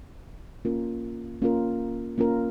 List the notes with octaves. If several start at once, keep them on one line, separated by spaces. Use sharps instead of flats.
A#3 C#4 F4 A#4
A#3 C#4 F4 A#4
A#3 C#4 F4 A#4